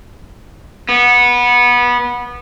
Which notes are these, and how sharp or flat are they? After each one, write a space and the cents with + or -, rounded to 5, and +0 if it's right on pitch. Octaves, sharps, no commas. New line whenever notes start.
B3 -20